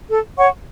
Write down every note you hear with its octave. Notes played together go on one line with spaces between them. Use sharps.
A4
C#5 F#5 C#6